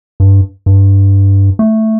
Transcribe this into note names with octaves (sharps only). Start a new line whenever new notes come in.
G2
G2
A3